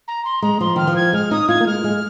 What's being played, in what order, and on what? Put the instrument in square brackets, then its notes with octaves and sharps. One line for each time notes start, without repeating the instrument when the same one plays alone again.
[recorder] A#5
C6
[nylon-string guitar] G#3 [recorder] A#5
[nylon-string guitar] F3 [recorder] C6
[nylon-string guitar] D#3 [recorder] F6
[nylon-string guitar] F3
[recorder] G#6
[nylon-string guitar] G#3 [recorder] F6
[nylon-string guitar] D#4 [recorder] D#6
[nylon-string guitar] F4 [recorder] G#6
[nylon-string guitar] A#3
[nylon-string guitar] G#3 [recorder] F6
[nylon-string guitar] G#3